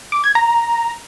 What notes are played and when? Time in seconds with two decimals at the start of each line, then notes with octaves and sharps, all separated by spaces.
0.12 D6
0.24 G#6
0.35 A#5